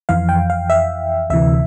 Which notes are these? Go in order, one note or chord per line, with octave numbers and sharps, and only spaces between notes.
F2 E3 F5
G5
F5
E5
D2 C3 E3 E5